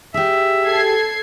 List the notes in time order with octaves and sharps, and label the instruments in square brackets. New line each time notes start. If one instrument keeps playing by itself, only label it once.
[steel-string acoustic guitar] G4 G#4 [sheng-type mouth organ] E5
[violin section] A4 G#6 C7